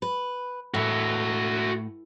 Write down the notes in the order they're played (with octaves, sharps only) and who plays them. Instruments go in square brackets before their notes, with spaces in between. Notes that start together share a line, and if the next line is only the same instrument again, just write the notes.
[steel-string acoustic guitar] B4
[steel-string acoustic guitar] A2 [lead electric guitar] F#4 E5